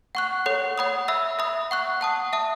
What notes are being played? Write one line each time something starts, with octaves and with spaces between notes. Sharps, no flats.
F#5 C#6 F#6
A4 C#5 F#5
C#5 F#5 B5 D#6
E5 B5 E6
E5 B5 D#6
F#5 C#6 F#6
F#5 A5 D#6
E5 A5 D#6